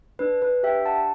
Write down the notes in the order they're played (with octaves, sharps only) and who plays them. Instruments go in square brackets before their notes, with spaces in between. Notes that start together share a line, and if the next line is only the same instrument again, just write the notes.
[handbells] D4 B4
B4
G4 E5 G5
F#5 A5